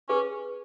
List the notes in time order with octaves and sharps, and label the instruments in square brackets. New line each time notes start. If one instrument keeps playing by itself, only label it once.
[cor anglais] C#4 [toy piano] G#4 B4